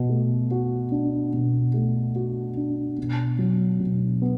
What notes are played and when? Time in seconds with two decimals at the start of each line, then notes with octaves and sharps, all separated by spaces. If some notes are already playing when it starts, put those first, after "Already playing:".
Already playing: B2
0.09 A3
0.51 F#4
0.92 D4
1.34 B2
1.74 A3
2.15 F#4
2.57 D4
2.98 B2
3.39 F#3
3.80 B2
4.22 B3